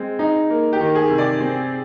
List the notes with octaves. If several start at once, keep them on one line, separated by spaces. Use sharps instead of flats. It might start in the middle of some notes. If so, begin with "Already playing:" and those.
Already playing: G#3 C4
D#4
A#3
G4
D#3
G#4
C3
D5
C4